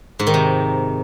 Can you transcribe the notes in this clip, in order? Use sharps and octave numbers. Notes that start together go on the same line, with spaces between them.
G#2
D#3
C3